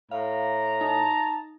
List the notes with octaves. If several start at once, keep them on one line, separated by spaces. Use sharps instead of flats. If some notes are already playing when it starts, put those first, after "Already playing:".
A2 F5 A#5
D#4 A5